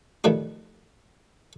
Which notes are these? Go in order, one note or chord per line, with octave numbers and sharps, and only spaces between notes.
D#3 F3 G3 A3 F#4